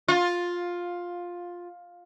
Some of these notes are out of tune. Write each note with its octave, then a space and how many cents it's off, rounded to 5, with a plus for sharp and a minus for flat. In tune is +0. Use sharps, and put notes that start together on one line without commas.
F4 +10